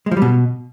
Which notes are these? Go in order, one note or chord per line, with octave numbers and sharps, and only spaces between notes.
G#3
F3
G3
B2